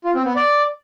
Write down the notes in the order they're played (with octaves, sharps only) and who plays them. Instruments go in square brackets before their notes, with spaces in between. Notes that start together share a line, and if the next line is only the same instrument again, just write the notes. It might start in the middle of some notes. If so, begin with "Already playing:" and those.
[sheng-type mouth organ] F4
C4
B3
D5